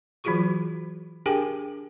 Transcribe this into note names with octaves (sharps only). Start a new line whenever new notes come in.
E3 F#3 F4 F#4 G#4 C#6
D4 G4 G#4 A#4 G5 G#5